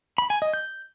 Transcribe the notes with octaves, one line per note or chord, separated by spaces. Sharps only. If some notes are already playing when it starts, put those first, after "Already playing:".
B5
G#5
D#5
G6